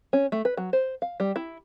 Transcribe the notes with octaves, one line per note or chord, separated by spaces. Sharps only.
C#4
A3
B4
F#3
C5
F5
G3
E4